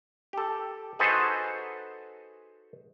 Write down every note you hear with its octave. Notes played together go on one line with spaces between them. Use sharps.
G4 A4
D#4 F#4 G#4 A4 B4 C5